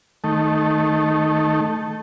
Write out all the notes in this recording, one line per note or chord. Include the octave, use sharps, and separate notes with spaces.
D#3 A3